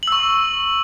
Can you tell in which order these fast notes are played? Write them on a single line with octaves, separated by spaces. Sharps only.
F#7 E6 C#6